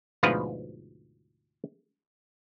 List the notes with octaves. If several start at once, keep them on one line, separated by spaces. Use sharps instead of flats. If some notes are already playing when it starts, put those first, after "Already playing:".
D2 G#2 B2 F3 B4 F5